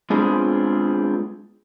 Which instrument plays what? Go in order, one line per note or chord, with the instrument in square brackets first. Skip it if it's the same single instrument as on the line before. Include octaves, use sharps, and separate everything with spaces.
[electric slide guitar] G#3 B3 C4 D4 F4 G#4